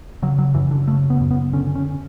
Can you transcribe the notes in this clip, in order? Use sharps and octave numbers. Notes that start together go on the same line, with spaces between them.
C#3 F#3
F#3
F#2 E3
D3
C#3 A3
B3
F#2
B3
D3 C#4
C#4